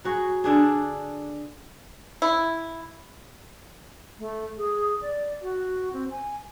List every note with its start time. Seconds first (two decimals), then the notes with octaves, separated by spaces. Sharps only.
0.04 F#3 F#4 G#4
0.44 D3 D4 G#4
2.22 E4
4.19 A3
4.57 G#4
5.02 D5
5.42 F#4
5.93 C4
6.10 G#5